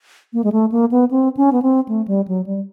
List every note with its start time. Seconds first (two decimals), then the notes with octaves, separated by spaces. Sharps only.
0.33 A#3
0.44 G#3
0.52 A3
0.72 A#3
0.91 B3
1.11 C4
1.37 C#4
1.53 B3
1.62 C4
1.88 A3
2.08 G3
2.28 F#3
2.46 G3